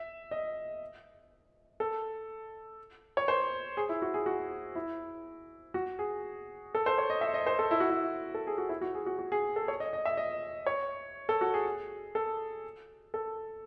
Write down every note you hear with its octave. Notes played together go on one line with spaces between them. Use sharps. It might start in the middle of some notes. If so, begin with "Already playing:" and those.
Already playing: E5
D#5
A4
C#5
C5
G#4
E4
F#4
G#4
F#4
E4
F#4
G#4
A4
C5
C#5
D#5
E5
D#5
C5
A4
E4
F#4
E4
A4
G#4
F#4
E4
F#4
G#4
F#4
F#4
G#4
A4
C#5
D#5
D#5
E5
D#5
C#5
A4
F#4
G#4
A4
A4